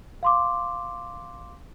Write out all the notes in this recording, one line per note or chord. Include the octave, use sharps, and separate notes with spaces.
F5 C6 D6